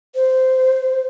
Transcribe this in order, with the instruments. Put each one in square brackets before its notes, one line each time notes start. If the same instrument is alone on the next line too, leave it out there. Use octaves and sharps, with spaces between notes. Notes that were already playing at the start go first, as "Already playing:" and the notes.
[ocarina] C5